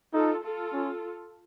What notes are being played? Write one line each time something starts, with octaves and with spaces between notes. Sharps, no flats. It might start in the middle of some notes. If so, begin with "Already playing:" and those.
D#4 F4 A4
F4 A4
C#4